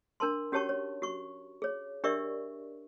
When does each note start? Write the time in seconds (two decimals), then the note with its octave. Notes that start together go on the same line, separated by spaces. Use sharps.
0.20 D4 A#4 A5 C6
0.52 C#4 F#4 G4 C#5 A5 C#6
0.69 C#5
1.02 F#4 C#6
1.62 G#4 C#5
2.04 D4 G4 A#4 D5 E5 C#6